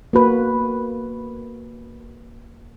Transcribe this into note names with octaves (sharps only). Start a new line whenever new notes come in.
A#3 F#4 B4